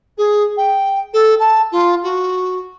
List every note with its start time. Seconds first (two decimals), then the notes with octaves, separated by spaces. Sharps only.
0.17 G#4
0.57 G5
1.13 A4
1.39 A5
1.71 F4
2.03 F#4